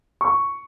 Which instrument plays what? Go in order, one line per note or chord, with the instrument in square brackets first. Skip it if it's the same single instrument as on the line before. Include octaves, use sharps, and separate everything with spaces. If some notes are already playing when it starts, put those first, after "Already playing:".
[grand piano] C#6